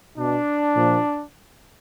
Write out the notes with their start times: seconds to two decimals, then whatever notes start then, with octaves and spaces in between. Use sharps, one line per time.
0.17 B2 D4
0.76 A#2 F3